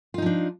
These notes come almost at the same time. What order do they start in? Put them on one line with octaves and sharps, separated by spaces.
F4 D#4 F3 D4